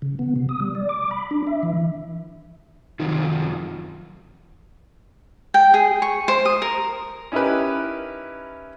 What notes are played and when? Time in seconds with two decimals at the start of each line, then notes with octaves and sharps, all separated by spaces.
0.02 C#3
0.19 B3
0.36 C3
0.49 D#6
0.60 G3
0.75 D5
0.89 D6
1.11 B5
1.31 D4
1.47 E5
1.63 E3
3.00 F#2 C3 D#3 F3
5.54 G5
5.74 G#4
6.02 C#6
6.28 C5
6.45 D#6
6.62 A#4
7.32 C#4 D#4 E4 G4 A#4 B4